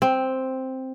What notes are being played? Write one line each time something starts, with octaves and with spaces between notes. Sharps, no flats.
C4